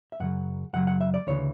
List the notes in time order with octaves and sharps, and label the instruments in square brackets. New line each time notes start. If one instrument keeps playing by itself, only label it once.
[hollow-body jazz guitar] E5
F#2 C#3 F#3 F#5
F#2 C#3 F#3 F#5
F#5
E5
D5
D2 C#3 E3 C#5